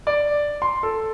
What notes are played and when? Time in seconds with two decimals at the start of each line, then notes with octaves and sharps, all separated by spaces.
0.07 D5
0.62 C6
0.83 A4